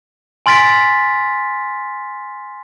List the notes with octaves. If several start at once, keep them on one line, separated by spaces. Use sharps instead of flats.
G#5 C6 F6 A6 B6 D7